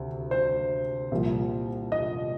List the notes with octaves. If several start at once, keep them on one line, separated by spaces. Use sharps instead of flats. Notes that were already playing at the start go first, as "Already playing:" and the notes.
Already playing: D2 C3
C5
C2 A#2 F3
D#5